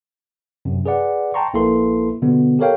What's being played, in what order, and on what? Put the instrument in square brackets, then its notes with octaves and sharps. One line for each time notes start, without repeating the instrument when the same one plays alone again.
[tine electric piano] F#2 C3
G#4 B4 D5 F#5
G5 A5 A#5 C6 C#6
A#1 A#3 E4 A4 B4 C6
B2 D3 G3 B3
G4 A4 A#4 C#5 F5 G5